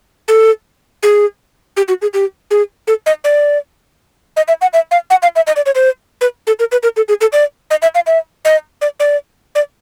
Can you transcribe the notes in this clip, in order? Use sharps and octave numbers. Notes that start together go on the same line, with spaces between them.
A4
G#4
G4
F#4
G#4
G4
G#4
A4
D#5
D5
D#5
E5
F#5
E5
F5
F#5
F5
E5
D#5
D5
C#5
C5
B4
A4
A#4
B4
A#4
A4
G#4
A4
D5
D#5
E5
F5
E5
D#5
D5
D5
D5